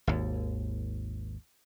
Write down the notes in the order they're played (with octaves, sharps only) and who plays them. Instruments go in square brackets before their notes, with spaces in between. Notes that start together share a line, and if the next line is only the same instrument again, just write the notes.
[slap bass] G#1 D#2